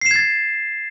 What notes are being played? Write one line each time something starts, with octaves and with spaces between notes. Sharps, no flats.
G#6 A6 C7 E7